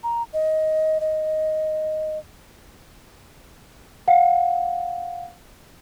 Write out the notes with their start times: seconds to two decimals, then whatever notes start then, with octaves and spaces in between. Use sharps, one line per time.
0.03 A#5
0.34 D#5
1.01 D#5
4.08 F5 F#5